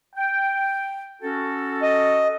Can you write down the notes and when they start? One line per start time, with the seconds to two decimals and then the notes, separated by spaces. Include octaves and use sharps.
0.15 G5
1.22 C#4 F#4 A4
1.82 D#5